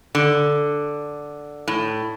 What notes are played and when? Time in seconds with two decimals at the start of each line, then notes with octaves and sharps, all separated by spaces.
0.15 D3
1.68 A2